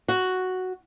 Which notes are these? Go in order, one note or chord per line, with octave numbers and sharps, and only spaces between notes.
F#4